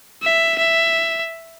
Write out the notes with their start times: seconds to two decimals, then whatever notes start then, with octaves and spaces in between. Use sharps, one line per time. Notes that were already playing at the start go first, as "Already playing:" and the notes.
0.23 E5
0.59 E5